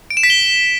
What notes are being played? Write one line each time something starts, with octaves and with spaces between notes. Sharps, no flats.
D7
E7
B6
G7